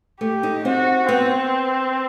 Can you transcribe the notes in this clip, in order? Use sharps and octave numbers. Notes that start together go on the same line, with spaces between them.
A3 G4
D#4
C4 F#4
B3 C4